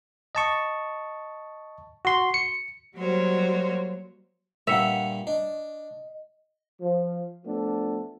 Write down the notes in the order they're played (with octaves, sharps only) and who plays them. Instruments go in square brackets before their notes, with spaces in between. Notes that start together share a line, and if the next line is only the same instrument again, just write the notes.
[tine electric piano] D#5 A5 C#6
F#4 C6
C#7
[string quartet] F#3 G3 A#3 F#4 C5 C#5
[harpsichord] G2 A#2 A#3 [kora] E5 [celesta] F#5 C#7 F7
[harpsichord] D4 [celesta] D#5
[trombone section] F3
F3 A3 B3 D4 A4